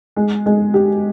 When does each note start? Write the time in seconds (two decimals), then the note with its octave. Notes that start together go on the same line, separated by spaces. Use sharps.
0.16 G#3
0.46 G#3
0.74 G4